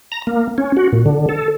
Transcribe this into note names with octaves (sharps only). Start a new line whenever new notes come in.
A#5
A#3
C#4
F#4
A#2
D3
A4